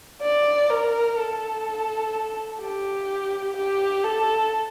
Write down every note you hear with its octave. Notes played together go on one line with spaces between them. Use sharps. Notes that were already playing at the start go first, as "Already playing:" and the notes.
D5
A#4
A4
G4
G4
A4